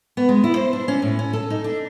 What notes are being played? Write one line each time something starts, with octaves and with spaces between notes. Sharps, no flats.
B3
G#3
E4
C5
D4
C#4
A2
C#4
A4
D#4
D4